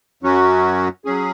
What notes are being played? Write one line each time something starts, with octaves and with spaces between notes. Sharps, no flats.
F#2 F#3 C#4 F#4
F#3 C#4 G#4